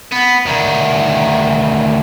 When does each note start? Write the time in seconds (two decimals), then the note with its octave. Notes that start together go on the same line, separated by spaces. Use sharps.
0.12 B3
0.46 D2 D#3